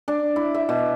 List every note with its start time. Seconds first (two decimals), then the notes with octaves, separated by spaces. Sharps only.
0.08 D4
0.36 E4
0.55 E5
0.69 B2